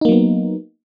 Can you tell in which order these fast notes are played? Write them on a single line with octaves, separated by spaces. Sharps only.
D#4 A#3 F#3 B3